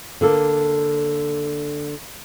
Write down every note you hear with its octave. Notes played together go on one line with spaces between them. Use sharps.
D3 A#3 A4